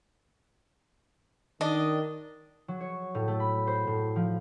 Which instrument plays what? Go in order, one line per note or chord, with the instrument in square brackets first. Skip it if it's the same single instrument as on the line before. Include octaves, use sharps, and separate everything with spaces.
[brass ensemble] D#3 [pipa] D4 [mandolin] D#5
[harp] F#3
C#5
A2
A3
B5
C5
A2
F3